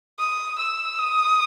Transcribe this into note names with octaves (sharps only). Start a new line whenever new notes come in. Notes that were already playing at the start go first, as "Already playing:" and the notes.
D#6
E6
D#6